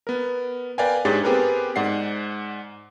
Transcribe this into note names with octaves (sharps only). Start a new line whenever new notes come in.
B3 A#4
A#4 B4 D5 F5 G5 G#5
G#2 D4 G4 G#4 C#5 A6
B3 C4 G4 G#4 A#4 B4
G#2 D5 F#5 C7